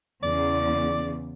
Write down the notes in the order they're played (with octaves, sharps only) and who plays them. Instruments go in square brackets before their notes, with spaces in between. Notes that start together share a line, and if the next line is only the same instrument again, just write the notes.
[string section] E2 C#3 [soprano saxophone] D5